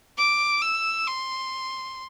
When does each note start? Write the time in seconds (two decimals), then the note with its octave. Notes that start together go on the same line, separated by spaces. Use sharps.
0.18 D6
0.62 E6
1.07 C6